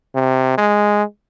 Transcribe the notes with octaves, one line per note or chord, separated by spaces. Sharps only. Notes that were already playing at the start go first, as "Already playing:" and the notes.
C3
G#3